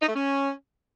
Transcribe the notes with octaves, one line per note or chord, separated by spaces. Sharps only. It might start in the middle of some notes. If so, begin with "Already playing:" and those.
D#4
A3
C#4